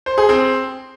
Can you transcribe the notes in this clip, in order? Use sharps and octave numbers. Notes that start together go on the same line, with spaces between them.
C5
G#4
C4